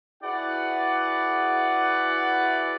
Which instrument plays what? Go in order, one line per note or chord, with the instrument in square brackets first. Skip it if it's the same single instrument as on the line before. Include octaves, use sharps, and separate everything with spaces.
[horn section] E4 F#4 G#4 B4 D5 F#5